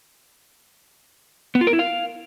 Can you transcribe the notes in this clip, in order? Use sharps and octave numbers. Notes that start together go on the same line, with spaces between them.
B3
F4
A#4
E4
F5